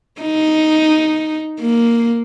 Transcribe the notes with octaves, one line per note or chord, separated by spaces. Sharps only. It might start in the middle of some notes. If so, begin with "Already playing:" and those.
D#4
A#3